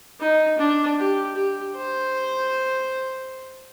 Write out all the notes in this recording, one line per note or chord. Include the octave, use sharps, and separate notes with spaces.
D#4
D4
G4
G4
C5